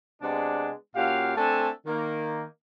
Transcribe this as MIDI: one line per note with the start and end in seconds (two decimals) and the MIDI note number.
0.22 0.71 48
0.22 0.71 56
0.22 0.71 59
0.22 0.71 62
0.95 1.33 46
0.95 1.33 61
0.95 1.33 66
0.95 1.33 67
0.95 1.33 77
1.36 1.68 57
1.36 1.68 60
1.36 1.68 62
1.36 1.68 69
1.36 1.68 80
1.36 1.68 81
1.87 2.44 51
1.87 2.44 58